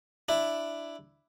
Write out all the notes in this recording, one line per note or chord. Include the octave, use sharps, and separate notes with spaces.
D4 E4